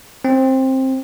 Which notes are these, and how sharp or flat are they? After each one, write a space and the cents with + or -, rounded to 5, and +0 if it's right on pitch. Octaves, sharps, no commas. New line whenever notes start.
C4 +15